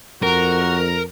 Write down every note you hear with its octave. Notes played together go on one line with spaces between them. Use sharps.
F2 F#4 A#4